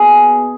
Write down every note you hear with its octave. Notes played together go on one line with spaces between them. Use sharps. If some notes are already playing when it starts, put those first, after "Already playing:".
Already playing: B2 G#4